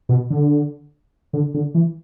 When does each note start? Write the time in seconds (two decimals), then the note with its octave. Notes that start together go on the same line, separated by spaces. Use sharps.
0.09 B2
0.30 D3
1.33 D3
1.54 D3
1.75 E3